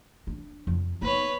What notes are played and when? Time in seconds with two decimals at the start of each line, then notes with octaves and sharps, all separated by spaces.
0.27 D4
0.67 F2
1.02 B3 D#4 B4 C#5